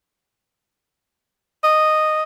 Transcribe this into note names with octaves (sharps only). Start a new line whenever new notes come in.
D#5